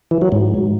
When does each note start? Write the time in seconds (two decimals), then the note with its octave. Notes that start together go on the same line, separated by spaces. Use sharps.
0.11 E3
0.22 F#3
0.32 G#2